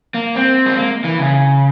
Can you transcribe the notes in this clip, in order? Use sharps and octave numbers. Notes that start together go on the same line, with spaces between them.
A#3
C4
G#3
A#3
E3
C#3